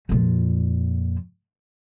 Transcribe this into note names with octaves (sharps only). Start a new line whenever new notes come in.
F2 A#2